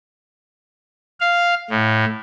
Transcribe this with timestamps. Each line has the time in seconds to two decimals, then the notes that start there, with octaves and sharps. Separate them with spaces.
1.20 F5
1.70 A2